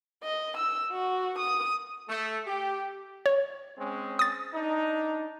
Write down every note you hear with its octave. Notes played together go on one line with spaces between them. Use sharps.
D#5
E6
F#4
D#6
A3
G4
C#5
G#3 C4 C#4
D#6 A6
D4 D#4